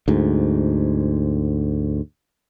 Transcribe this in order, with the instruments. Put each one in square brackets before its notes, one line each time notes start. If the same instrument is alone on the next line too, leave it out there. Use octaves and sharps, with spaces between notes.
[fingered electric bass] D2 G#2